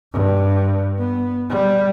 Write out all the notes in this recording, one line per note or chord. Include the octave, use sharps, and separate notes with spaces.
G2
B3
G3